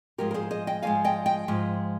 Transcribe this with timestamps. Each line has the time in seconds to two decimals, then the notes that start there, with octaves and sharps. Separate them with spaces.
0.18 G#2 F3 G#3 G4 A#4
0.31 A#4
0.34 G#4 C5
0.51 C5 D#5
0.67 D#5 G5
0.82 G#2 F3 G#3 F5 G#5
1.04 D#5 G5
1.26 D#5 G5
1.48 G#2 F3 G#3